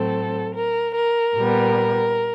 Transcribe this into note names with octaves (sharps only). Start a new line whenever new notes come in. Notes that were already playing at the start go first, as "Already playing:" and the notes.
Already playing: A2 F#3 A3 C4 A4
A#4
A#4
A#2 G3 B3